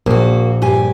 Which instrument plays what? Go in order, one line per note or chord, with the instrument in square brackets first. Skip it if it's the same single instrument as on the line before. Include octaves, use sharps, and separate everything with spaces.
[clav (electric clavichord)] A#1 [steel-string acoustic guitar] A#3 F#4
[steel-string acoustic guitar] G2 G4 G#5